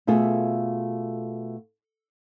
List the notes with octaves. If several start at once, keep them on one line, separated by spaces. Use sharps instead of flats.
B2 A3 F4 G#4 E5